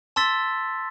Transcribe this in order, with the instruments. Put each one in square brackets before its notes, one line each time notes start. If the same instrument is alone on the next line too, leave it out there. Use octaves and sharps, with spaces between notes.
[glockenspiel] A5 C6 E6 A6 B6